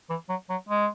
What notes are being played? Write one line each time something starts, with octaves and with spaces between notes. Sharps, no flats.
E3
F#3
F#3
G#3